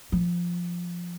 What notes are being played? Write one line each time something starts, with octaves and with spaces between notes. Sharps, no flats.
F3